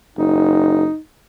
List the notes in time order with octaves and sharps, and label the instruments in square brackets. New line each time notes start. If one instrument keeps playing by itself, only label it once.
[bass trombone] F#1 [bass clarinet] D#4